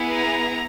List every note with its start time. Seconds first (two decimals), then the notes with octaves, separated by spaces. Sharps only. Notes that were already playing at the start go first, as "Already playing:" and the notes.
Already playing: B3 E4 G#4
0.13 A#5